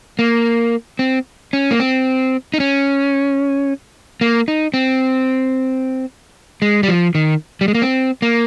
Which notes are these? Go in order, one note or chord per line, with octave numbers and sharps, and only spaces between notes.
A#3
C4
C#4
A#3
C4
D#4
C#4
A#3
D#4
C4
G#3
G3
F3
D#3
G3
G#3
A#3
C4
A#3